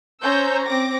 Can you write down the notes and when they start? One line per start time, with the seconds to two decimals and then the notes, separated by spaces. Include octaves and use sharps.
0.22 C#4 C5 C#5 A#5 E6 G6
0.66 C4 D6 A#6